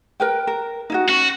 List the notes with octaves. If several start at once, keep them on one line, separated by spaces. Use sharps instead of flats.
A#4 B4 G5
A#4
D#4 E4 F#4
C#4 F#4